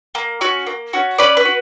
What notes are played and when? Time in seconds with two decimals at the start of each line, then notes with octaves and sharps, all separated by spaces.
0.15 A#3
0.41 C#4 F#4
0.67 A#3
0.93 C#4 F#4
1.18 C#4 B4 D5
1.37 B4
1.45 F#4